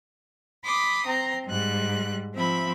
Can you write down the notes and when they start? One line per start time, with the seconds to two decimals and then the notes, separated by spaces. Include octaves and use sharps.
0.65 B5 C6 D6 D#6
1.06 C4 A#5 C6
1.45 G#2 G3 F#6
2.34 F3 C4 E5 B5